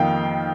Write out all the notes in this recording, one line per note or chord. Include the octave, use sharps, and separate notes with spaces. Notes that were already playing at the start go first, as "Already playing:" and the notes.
Already playing: F2 D#3 A#3 F5 G5